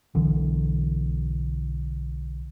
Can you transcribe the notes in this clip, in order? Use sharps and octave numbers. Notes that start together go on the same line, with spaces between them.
B1 D3 E3